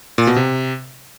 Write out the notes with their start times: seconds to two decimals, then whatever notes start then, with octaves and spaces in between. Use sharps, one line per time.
0.18 A#2
0.27 B2
0.36 C3